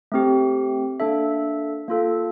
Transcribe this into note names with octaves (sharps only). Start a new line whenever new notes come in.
A3 C4 G4
A#3 D4 A4 E5
A#3 F4 A4